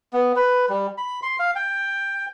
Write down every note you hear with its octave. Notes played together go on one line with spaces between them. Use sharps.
B3
B4
G3
B5
C6
F5
G5